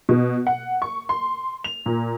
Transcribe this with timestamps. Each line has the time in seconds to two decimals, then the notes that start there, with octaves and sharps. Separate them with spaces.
0.09 B2
0.47 F#5
0.82 C#6
1.09 C6
1.64 F7
1.86 A#2